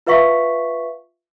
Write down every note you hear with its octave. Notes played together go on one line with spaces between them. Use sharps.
F4 B4 E5 F5 C#6 B6